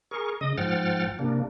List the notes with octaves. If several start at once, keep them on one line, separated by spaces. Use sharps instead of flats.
G#4 A#4 C#6
C#3 D#5 D#6
G#2 F3 F#5 G5 F6 A6
C3 A#3 D4